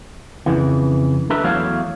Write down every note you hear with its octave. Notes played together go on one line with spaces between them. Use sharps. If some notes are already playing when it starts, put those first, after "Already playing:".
F2 C#3 E3
D4 G4 A4 B4 E5
E2 F#3 A3 C#5 F5